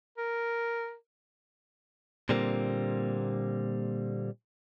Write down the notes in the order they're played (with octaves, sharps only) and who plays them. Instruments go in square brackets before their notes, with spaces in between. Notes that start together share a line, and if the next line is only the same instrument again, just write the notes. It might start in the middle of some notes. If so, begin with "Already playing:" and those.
[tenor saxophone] A#4
[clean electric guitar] A#2 D3 G3 A#3 C4